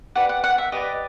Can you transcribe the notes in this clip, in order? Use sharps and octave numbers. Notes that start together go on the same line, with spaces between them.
G4 B4 D5 F#5
F#5
F#5
E5
G4 B4 D5 D#5